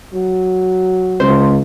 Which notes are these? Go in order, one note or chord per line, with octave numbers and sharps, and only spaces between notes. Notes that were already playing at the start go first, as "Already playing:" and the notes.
F#3
C#2 C5